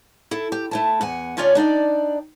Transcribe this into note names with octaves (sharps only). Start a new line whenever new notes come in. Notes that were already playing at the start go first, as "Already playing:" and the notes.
E4 A4
G4
A3 E4 A5
E2 F#5 G#5
D2 C#4 F4 C#5 D5
D4 D#4 D5 G5